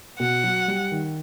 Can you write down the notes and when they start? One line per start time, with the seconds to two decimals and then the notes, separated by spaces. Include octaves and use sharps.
0.19 B2 F#5
0.44 F#3
0.68 G3
0.92 D#3